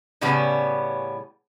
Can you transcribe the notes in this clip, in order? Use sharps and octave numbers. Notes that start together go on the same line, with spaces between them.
A2 C#3 E3 G3 B3 C#4